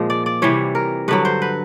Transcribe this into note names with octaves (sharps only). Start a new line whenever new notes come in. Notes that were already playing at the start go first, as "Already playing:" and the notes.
Already playing: A#2 F3 G#3
D5
D5
C3 E3 G3 C#5
A#4
G2 D3 F#3 B4
C5
B4